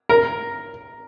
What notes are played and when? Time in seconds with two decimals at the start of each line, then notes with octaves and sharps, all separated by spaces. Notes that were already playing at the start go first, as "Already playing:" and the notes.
0.09 A#4